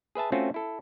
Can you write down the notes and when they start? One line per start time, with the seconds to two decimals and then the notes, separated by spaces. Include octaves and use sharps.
0.15 G#4 B4 E5 A5
0.32 A3 C4 C#4 F4 F#4
0.54 E4 A4